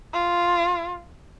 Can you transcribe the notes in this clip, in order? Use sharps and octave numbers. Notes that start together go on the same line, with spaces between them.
F4